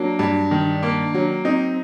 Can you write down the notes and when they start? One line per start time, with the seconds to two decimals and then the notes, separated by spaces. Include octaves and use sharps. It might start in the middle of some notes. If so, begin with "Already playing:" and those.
Already playing: F#3 A#3 D4
0.19 G2
0.51 D#3
0.83 A#3
1.14 F#3
1.45 C4 D#4